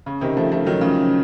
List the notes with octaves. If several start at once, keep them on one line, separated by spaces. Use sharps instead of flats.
C#3
C3 D#3
F3 A3
F3 A3
D#3 F#3
C#3 F3